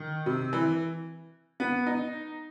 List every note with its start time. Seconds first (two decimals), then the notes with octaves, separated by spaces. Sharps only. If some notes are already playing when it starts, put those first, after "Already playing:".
Already playing: D#3
0.26 C3
0.53 E3
1.60 B3
1.87 D#4